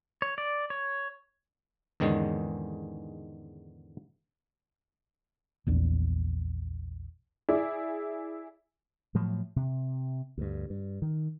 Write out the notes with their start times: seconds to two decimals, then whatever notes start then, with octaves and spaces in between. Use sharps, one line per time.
0.22 C#5
0.38 D5
0.70 C#5
2.00 E2 G#2 D3 D#3 G#3 C#4
5.67 A#1 E2 D4
7.49 E4 G#4 D5
9.15 A2 F3 F#3
9.56 C3
10.38 D2 G2
10.70 G2
11.02 D#3